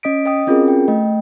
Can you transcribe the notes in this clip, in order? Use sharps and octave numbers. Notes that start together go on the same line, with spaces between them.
C#4 D#5 D#6 B6 D7
D#5 G5 D#6
C4 C#4 F4 F#4 G#4 A#4
G5
A3 D#5 G5